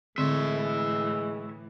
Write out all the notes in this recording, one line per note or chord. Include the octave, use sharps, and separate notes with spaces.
A2 D3 E3 G#3 C4 C#5 E5